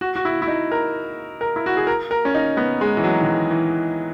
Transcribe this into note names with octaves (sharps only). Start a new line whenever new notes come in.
F#4
F#4
E4
E4
D#4
A#4
A#4
E4
F#4
G#4
A#4
A#4
C#4
D#4
B3
G#3
E3
F#3
D#3
E3
E3